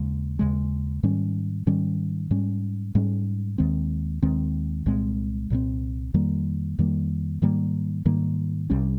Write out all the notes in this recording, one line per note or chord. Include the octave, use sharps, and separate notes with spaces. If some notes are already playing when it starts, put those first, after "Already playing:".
Already playing: D#2 C#3 G#3
D#2 C#3 G#3
G#2 D#3 G3 C#4
G#2 D#3 G3 C#4
G#2 G3 C#4
G#2 G3 C#4
D#2 D#3 G#3 C4
D#2 D#3 G#3 C4
C2 A#2 G#3 C4
C2 A#2 G#3 C4
F2 D#3 G3 A#3
F2 D#3 G3 A#3
G#2 D#3 G3 A#3
G#2 D#3 G3 A#3
C2 C3 G3 C#4